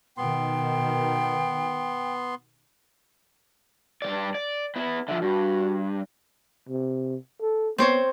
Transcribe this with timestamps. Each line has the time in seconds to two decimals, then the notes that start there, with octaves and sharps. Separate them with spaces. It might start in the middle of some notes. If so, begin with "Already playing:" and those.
0.17 B2 D#3 B3 G5 C6
4.02 G2 D#3 D5
4.35 D5
4.76 B3 E4
5.08 D3 F3 E5
5.22 G2 F#4
6.69 C3
7.41 A4
7.78 B3 C4 C5 C#5